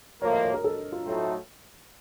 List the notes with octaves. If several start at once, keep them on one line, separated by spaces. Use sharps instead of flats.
A2 F3 A#3 C#5
D#5
C#5
A#4
A4
F4
A2 F#3 A3 C4 D#4